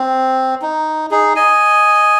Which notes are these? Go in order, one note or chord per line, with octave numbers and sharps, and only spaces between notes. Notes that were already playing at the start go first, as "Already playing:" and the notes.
Already playing: C4
D#4
D#4 G#4
D#5 G#5